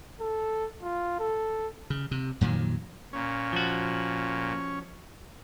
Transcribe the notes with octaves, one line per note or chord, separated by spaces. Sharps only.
A4
F4
A4
C#3
C3
F2 A#2 D#3 F#3
A#2 C#4
F3 F#4